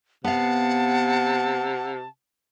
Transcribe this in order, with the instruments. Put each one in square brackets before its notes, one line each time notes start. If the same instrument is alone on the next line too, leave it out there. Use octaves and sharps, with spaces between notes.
[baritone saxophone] C3 [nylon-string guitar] B3 F5 [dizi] F#5 [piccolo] A5